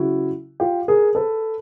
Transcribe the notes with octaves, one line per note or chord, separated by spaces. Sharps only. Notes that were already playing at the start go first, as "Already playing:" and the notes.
Already playing: C#3 F#3 E4 F#4
F4 G4
G#4 A#4
A4 B4